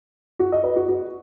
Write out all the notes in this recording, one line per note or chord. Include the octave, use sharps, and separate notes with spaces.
F#4
D#5
B4
F#4
F#4